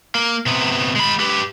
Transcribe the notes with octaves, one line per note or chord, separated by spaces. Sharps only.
A#3
C3 B3
G#3 B5
G4 B4